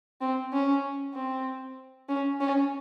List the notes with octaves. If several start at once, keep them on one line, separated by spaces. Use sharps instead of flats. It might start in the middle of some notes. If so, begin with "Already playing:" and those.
C4
C#4
C4
C#4
C#4